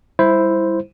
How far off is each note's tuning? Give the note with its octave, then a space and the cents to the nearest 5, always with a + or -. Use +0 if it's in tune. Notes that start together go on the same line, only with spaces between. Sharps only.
G3 +10 E4 +0 C5 +0